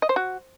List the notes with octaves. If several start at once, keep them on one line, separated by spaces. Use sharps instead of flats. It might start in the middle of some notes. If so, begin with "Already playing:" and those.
D#5
C5
F#4